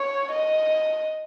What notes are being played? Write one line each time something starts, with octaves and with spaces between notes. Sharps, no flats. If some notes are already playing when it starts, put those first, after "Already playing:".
Already playing: C#5
D#5